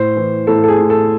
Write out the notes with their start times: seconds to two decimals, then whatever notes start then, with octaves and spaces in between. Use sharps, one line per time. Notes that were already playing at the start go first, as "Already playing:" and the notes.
Already playing: A2 C5
0.17 E3
0.47 A2 A4
0.63 A4
0.68 G#4
0.80 A2
0.90 A4